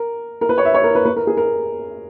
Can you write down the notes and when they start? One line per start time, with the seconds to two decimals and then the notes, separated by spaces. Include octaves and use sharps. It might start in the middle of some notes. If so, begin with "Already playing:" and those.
Already playing: A#4
0.41 A#4
0.49 B4
0.58 C#5
0.65 E5
0.74 C#5
0.84 A#4
0.95 B4
1.05 B4
1.16 A#4
1.27 G#4
1.37 A#4